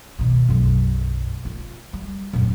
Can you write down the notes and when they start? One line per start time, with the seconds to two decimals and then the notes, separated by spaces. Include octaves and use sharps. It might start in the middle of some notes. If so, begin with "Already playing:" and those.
0.19 B2 D#3
0.48 B1 F#2
1.45 F4
1.93 G3
2.33 D#1 F#2